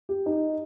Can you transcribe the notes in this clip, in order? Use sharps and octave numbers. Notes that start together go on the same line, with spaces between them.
G4
D#4